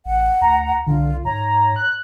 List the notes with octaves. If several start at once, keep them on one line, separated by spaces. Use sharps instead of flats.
A1 F#5
D2 A#5
C2 D3 F4
G#2 C#5 A#5
F#6